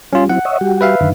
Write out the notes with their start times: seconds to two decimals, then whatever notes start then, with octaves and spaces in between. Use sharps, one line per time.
0.13 G3 C#4 F4
0.29 F#3 C4 E4 F#5
0.45 C#5 D#5 E5
0.61 G3 F#4 G4
0.81 B4 E5 F5
1.01 F#2 D3 D#3